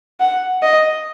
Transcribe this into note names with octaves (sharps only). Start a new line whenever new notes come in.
F#5
D#5